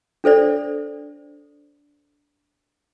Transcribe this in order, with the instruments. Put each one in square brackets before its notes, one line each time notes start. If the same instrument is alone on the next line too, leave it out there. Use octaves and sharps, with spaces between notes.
[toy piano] D4 A4 C5 D5